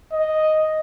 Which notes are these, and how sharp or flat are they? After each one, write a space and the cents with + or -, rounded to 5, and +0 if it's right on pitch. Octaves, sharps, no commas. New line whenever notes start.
D#5 +0